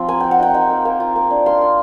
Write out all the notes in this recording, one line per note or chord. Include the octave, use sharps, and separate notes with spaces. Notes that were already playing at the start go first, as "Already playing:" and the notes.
Already playing: F3 C4
A#3 G#5
A#3 G5
F#5
D#4 G5
D#4 G5
A#3
A#3
F4
A#3
D4
A#3 C6
F4